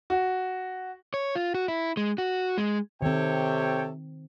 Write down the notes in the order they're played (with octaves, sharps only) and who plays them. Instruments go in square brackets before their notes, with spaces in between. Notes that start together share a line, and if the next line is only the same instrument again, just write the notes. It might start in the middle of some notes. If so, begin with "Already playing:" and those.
[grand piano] F#4
[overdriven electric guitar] C#5
F4
F#4
E4
G#3
F#4
G#3
[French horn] C3 [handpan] D#3 C4 [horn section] A4 C#5 G5